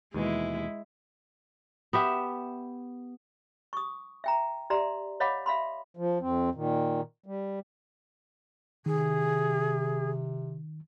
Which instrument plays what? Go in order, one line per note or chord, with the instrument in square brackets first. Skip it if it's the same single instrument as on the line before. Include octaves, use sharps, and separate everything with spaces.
[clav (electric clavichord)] D#2 B2 E3 [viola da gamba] G#3 E4
[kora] B3 G4 E5
[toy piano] C#6 D#6
E5 G5 A#5
G4 D5 E5 A#5 C6
C#5 D#5 F5 F#5 B5 D6
E5 F5 B5 C6
[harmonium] F3
F2 C4
A#2 D#3
G3
[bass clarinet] C3 [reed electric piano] D#3 [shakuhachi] G#4